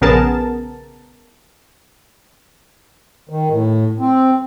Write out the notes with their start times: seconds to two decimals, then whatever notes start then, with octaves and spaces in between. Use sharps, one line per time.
0.01 A#1 C#3 B3 G#4 A#4 A5
3.29 D#3
3.50 A2
3.99 C4